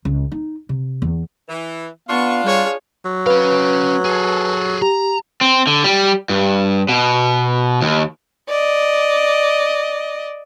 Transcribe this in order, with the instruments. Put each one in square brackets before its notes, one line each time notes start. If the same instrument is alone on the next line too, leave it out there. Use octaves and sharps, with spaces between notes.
[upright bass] C#2
D#4
C3
E2
[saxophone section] E3
[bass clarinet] B3 [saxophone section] D4 F4 [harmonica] F5 [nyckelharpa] C#6
[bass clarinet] G3 [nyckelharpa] G#4 C#5
[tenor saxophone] F#3
[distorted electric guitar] C#4 F5 [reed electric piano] B4
[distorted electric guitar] G#4 A4
[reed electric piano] G4 [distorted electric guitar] A#5
[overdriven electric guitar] C4
D3
G3
G2
B2
D#2
[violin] D5 D#5